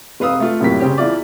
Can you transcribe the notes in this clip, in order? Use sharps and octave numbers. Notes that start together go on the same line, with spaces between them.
F1 B4 F5 D#6 E6
A3 F4
F#2 A2 C3 G3 A#3 B6
C#3 C4 G4
E2 E4 F4 D5